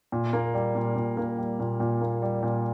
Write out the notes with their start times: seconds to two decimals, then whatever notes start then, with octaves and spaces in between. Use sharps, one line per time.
0.12 A#2
0.33 A#3
0.54 G3
0.75 A#2
0.96 A#2
1.17 A#3
1.38 G3
1.59 A#2
1.80 A#2
2.01 A#3
2.22 G3
2.43 A#2